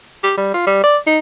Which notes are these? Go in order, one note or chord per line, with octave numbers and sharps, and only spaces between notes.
G4
G3
F4
G3
D5
D#4